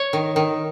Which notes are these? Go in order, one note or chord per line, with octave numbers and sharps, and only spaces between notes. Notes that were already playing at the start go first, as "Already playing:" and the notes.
Already playing: C#5
D#3
D#3